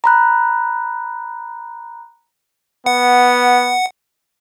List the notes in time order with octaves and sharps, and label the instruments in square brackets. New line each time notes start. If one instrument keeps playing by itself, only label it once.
[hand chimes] A#5 B5 F#6
[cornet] B3 [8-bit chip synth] F#5